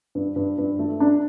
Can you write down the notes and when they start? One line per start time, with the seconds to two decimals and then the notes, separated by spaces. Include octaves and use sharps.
0.15 G2
0.36 G2
0.58 G2
0.79 A3
1.00 D4